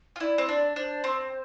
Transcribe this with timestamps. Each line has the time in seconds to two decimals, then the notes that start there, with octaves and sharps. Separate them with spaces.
0.16 F4
0.20 E4 D5
0.38 C4
0.48 D4 D5
0.76 D4 C5
1.04 C4